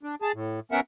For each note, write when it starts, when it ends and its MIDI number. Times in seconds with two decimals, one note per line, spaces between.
0.03 0.15 62
0.22 0.32 68
0.22 0.32 81
0.34 0.60 45
0.72 0.80 59
0.72 0.80 61
0.72 0.80 70
0.72 0.80 76
0.72 0.80 78